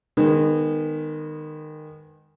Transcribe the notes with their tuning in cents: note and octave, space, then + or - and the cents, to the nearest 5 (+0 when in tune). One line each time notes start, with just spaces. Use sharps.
D#3 -20 G#3 -25 B3 +0